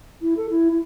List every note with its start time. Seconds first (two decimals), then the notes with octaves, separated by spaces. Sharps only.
0.21 E4
0.37 A4
0.50 E4
0.71 E4